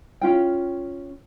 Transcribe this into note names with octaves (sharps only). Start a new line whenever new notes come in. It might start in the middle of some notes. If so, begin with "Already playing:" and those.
C#4 F4 G5